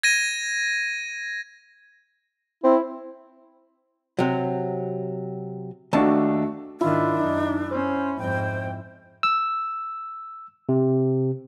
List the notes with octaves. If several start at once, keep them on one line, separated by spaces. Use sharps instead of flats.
G#6 A#6 D#7
C4 E4
C3 F#3
D#2 A3 D4 F#4 A5
G#2 D#3 D4 E4 F4
F#2 D#4
C#4 C5
F2 G#2 C5 G5
E6
C3